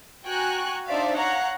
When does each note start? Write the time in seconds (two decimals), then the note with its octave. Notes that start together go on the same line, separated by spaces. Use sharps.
0.25 F#4 G5 G#5 A#5 C#6 F#6
0.87 D4 D#4 C5 D5 E5 F5
1.17 C#5 F5 F#5 A#5